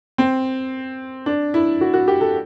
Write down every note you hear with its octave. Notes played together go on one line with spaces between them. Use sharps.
C4
D4
E4
F#4
F#4
G4
A4